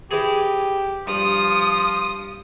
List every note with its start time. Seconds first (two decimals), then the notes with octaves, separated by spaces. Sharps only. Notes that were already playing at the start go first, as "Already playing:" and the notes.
0.11 E3 G4 G#4
1.07 G2 F3 D#6